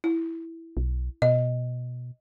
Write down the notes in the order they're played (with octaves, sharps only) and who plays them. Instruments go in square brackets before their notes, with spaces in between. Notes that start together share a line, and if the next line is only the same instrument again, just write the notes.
[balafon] E4
[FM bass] B1
[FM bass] B2 [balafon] D#5